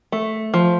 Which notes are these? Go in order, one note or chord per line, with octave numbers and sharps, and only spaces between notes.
A3
F3